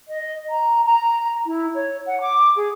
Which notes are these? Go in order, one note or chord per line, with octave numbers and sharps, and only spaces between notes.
D#5
A#5
A#5
E4
C#5
F#5
D6
G#4